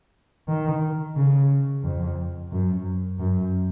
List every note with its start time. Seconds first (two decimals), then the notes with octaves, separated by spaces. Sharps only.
0.48 D#3
1.16 C#3
1.83 F2
2.52 F#2
3.19 F#2